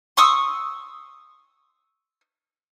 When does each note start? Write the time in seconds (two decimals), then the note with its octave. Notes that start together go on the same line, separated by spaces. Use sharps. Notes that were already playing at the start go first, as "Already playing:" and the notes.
0.17 C6 C#6 D#6 E6